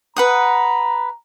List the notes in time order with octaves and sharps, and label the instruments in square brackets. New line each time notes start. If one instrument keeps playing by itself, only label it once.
[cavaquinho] B4 F#5 D#6 [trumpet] A#5